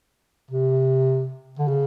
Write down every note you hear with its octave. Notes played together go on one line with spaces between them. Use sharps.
C3
D3
C#3